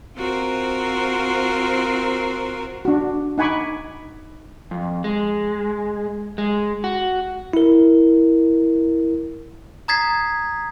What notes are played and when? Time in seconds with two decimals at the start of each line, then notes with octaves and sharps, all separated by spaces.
0.16 C4 F4 F#4 A#4 C5
2.85 D4 F#4
3.38 D#4 F#5 G#5 B5 C#6 D6
4.71 F2
5.04 G#3
6.38 G#3
6.84 F#4
7.53 E4 A#4
9.88 A#5 D#6 G#6 A6 B6 C7